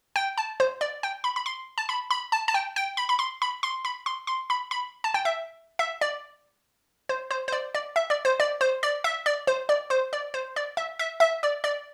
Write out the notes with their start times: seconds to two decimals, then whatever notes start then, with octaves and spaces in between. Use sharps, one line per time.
0.16 G5
0.38 A5
0.60 C5
0.81 D5
1.03 G5
1.24 B5
1.36 B5
1.46 C6
1.78 A5
1.89 B5
2.11 B5
2.32 A5
2.48 A5
2.54 G5
2.76 G5
2.97 B5
3.09 B5
3.19 C6
3.42 B5
3.63 C6
3.85 B5
4.06 C6
4.27 C6
4.50 B5
4.71 B5
5.04 A5
5.14 G5
5.25 E5
5.79 E5
6.01 D5
7.09 C5
7.31 C5
7.48 C5
7.52 D5
7.75 D5
7.96 E5
8.10 D5
8.25 C5
8.40 D5
8.61 C5
8.83 D5
9.04 E5
9.26 D5
9.47 C5
9.69 D5
9.90 C5
10.13 D5
10.34 C5
10.56 D5
10.77 E5
10.99 E5
11.20 E5
11.43 D5
11.64 D5